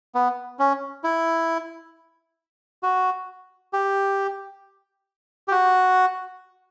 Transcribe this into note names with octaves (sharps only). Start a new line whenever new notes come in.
B3
C#4
E4
F#4
G4
G4
F#4